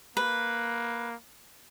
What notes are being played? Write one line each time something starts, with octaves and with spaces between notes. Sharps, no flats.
A#3 B4